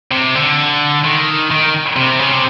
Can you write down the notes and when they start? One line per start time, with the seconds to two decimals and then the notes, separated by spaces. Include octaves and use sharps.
0.12 C3
0.35 D3
1.05 D#3
1.51 D#3
1.96 C3
2.20 C#3
2.33 C3